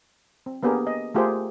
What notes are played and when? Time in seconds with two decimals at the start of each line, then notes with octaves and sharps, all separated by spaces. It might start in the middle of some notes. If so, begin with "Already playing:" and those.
0.46 C4
0.63 A#3 B3 D4 G4 G#4 A#4
0.87 D#5
1.15 A3 F4 G4 G#4 A#4 C5